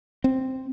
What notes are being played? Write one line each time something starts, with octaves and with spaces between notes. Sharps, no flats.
C4